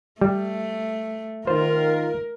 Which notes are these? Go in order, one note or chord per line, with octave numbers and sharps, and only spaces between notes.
G3 A3
D#3 F4 A#4 C5